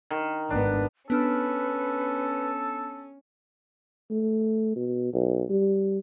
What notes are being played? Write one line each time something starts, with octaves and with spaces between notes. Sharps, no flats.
D#3
G#1 B3 D4
B3 C#4 D4 A4 B4 F6
A3
B2
B1
G3